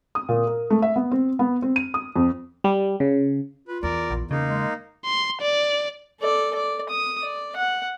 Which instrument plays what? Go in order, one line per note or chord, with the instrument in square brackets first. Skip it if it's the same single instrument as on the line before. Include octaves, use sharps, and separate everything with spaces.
[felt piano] D#6
A#2
A#4
A3
E5
B3
C4
B3
C4
D#7
D#6
F2
[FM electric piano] G3
C#3
[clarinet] F4 [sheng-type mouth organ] B4
[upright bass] E2 [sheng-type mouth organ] A#4 D5
[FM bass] A#1
[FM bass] C#3 [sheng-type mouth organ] A#3 D#4
[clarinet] G#3
[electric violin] C6
D5
[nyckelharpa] A4 D5
D5
D#6
D5
F#5